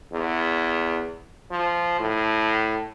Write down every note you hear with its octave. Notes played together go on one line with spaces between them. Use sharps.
E2
F3
A2